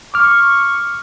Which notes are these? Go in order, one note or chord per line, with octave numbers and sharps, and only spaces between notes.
C#6 D6 F6